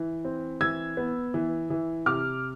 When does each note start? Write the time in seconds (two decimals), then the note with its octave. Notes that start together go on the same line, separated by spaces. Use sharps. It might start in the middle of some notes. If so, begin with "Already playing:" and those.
Already playing: E3
0.25 C4
0.61 E3 E6 G#6
0.97 B3
1.34 E3
1.70 E3
2.06 C3 D6 F6